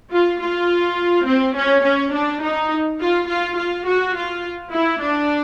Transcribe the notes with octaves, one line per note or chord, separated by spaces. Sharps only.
F4
F4
C4
C#4
C#4
D4
D#4
F4
F4
F4
F#4
F4
E4
D4